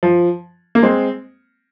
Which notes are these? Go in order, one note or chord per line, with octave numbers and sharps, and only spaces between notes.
F3
A#3
G#3 C4